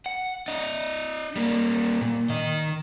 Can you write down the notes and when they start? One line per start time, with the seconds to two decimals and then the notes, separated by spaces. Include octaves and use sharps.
0.06 F#5
0.48 D4 D#5
1.36 G3 A#3
2.01 A#2
2.30 D#3 D#5